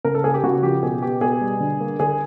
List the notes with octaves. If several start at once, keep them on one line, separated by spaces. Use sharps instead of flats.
C#3 A#4
A4
A#3 G#4
G4
C#3 F#4
F3 G4
B2 G#4
B3 G4
B2 G#4
G3
D3
A#3
D3 G#4